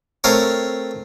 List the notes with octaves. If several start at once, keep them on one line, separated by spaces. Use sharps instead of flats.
A3 C4 A#4 C#5